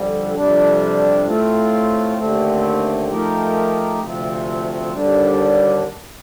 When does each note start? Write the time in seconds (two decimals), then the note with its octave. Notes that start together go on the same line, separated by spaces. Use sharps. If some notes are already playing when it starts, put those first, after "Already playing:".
Already playing: F2 D3 G3
0.34 F2 C3 G3 D4
1.26 A2 A3 C4 F4
2.17 D#2 D3 A3 C4
3.08 F3 A3 D#4 G4 A#4
4.00 D2 C3 F3 C4
4.92 D#2 D3 G3 D4